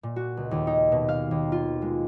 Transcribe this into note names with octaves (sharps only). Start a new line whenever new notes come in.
A#2
F#4
C#2
D#2
D#4
B2
F5
D#2
F4
G#3